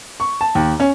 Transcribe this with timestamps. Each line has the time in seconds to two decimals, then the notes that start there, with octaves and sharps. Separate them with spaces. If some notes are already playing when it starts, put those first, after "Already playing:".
0.20 C#6
0.41 A5
0.55 D#2
0.80 C#4